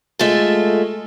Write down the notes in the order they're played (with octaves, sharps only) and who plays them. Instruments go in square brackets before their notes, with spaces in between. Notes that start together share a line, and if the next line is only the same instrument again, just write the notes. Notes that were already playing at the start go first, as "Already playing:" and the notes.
[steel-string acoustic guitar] G#3 A3 F4 A4